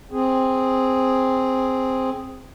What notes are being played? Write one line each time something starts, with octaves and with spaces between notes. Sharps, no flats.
C4 G#4